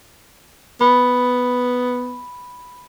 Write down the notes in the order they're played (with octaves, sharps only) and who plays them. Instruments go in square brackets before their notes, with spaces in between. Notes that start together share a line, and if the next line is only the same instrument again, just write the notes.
[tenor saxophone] B3 [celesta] B5